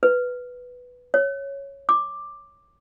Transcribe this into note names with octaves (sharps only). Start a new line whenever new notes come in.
B4
C#5
D6